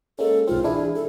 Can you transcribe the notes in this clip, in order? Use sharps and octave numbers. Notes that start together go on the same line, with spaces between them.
G#3 A#3 C#4 A4
B1 G#2 C4 F4
E3 D4 E4 G#4
A4